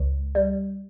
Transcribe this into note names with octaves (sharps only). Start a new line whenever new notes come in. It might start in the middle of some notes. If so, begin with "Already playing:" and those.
Already playing: C#2
G3